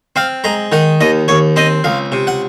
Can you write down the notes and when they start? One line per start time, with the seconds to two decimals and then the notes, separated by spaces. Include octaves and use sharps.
0.16 C4 F5
0.44 G#3 A#5
0.72 D#3 F#5
1.01 D#2 D#5
1.28 D#2 C#5
1.56 C4 D#5
1.84 C#2 F5
2.12 C3
2.27 F#5